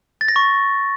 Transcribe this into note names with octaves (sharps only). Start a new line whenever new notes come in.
A6
A#6
C#6